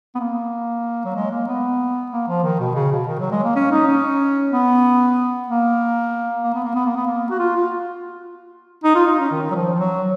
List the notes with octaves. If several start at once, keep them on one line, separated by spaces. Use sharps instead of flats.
B3
A#3
F#3
G#3
A#3
B3
A#3
F3
D#3
B2
C#3
B2
D#3
F#3
G#3
A#3
C#4
D#4
C#4
B3
A#3
A#3
B3
A#3
B3
A#3
B3
A#3
F#4
F4
F4
D#4
F4
D#4
C#4
D#3
F#3
F3
F3
F#3